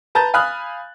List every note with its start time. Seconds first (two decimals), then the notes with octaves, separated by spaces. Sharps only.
0.15 B4 A5 A#5 G6 A6
0.34 F5 G#5 B5 D#6 F6 F#6